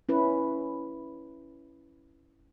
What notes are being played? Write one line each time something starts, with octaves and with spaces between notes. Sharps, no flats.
C#4 E4 B4